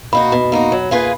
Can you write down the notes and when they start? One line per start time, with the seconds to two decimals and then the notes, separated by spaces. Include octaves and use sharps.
0.13 A#3 D#4 F#4 B5
0.32 B2
0.52 A#3 D#4 F#4
0.72 F#3
0.91 A#3 F4 G#4 B4